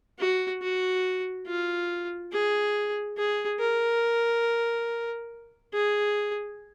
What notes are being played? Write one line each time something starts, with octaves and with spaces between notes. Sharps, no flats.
F#4
F#4
F4
G#4
G#4
A#4
G#4